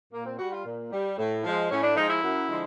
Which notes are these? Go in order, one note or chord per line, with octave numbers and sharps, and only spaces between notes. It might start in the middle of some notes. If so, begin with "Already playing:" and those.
A#2 A#3
C4
G3 F#4
F4
A#2
G3
A2
F3 G#3
A2 C#4
D4
F3 G#3 D#4
E4
F#2
D3 F3 G#3